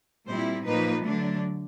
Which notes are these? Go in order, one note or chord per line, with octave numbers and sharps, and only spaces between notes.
A#2 G3 C4 E4 C5
A#2 F3 A#3 D#4 B4
D3 F#3 A3 D4